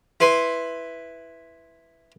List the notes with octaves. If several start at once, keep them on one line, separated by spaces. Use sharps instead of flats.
E4 B4 C6